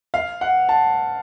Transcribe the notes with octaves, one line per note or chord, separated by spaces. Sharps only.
F5
F#5
A5